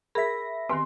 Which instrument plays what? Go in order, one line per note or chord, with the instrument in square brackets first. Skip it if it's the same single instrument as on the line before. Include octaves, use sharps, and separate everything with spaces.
[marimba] G#4 A#4 [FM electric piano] E5 A#6 [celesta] B5 B6
[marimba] D#3 B3 C4 [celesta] G4 B4 G#5 [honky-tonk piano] C6